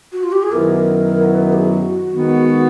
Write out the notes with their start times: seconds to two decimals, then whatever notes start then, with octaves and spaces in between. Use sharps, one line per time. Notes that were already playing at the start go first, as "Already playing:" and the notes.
0.12 F#4
0.23 F4
0.32 G4
0.42 G#4
0.51 F#2 D#3 F#3 B3 E4 A#4
1.32 B4
1.45 B4
1.52 G4
1.58 G#4
1.71 F#4
2.12 D#3 G#3 B3